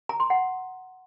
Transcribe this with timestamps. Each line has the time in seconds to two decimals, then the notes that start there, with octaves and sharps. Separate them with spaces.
0.09 A#5
0.20 C6
0.30 F#5